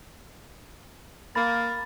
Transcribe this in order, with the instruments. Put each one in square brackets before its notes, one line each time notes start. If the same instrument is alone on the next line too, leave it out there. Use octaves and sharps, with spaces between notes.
[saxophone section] A#3 [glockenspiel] B5 A6